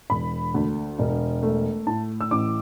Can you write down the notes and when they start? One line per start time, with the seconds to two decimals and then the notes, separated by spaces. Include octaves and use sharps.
0.10 E1 B5
0.54 D2
0.99 E1
1.43 A3
1.87 A2 A5
2.21 E6
2.31 A1 D6